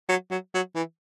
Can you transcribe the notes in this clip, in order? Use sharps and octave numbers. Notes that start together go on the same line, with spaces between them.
F#3
F#3
F#3
E3